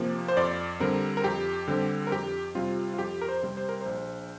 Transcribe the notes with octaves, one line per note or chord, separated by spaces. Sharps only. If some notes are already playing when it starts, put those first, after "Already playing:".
Already playing: C3 F3 A#3
C5
F2 D5
D3 G3 C4 A#4
A#4
F2 G4
D3 G3 C4
A#4
F2 G4
C3 G3 C4 F4
F4
F2 G4
A#4
C5
C3 G3 C4
C5
A#4
A#1 C5